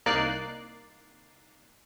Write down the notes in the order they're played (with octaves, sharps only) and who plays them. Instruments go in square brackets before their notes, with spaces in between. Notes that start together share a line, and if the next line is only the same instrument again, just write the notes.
[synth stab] C2 A#3 D#4 D5 F#6 C7